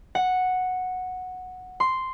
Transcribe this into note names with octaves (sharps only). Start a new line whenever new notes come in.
F#5
C6